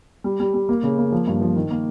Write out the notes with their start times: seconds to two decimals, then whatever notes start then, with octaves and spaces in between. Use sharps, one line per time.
0.24 G3
0.40 G3
0.54 G3
0.69 A#3
0.83 C#3
0.98 A#3
1.12 F3
1.27 G2
1.41 F3
1.56 D#3
1.71 A#3